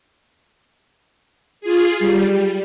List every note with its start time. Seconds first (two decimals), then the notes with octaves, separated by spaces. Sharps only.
1.61 F4 G#4
2.00 G3